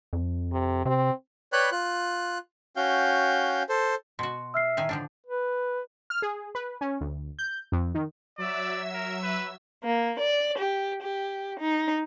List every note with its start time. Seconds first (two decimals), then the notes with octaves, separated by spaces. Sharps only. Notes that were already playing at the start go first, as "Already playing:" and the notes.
0.13 F2
0.52 C3
0.85 C3 C4
1.53 B4 C#5 D5 G5 B5 F#6
1.72 F4 F#6
2.76 C#4 F#4 F5 G5 G6
3.69 A4 C5
4.19 B2 F#4 C6
4.54 E5 E6 F6 C7
4.77 A2 D#3 G#5
4.89 D3 F3 D4
5.26 B4
6.10 F6
6.22 G#4
6.55 B4
6.81 C#4
7.01 D2
7.39 G6
7.72 F2
7.95 D#3
8.38 F#3 D5 E5 E6
8.94 A#4
9.23 B4
9.84 A#3
10.20 D5
10.58 G4
11.02 G4
11.61 D#4